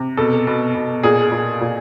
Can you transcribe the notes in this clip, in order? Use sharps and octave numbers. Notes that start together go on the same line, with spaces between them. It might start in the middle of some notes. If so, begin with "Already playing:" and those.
Already playing: C3
B2 A4
B2
B2
A#2 G#4
A#2
A#2